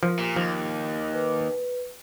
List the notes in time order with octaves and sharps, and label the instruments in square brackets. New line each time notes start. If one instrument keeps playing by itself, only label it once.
[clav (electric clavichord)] F3 [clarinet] A#4
[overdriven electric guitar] A#2 [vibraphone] G4
[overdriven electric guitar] D#2 [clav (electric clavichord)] F3
[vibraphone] B4